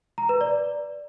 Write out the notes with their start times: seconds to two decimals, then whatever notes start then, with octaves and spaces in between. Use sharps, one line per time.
0.18 A#5
0.29 B4
0.41 D5